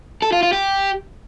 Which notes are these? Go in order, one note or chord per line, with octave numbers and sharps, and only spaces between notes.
A4
F4
F4
G4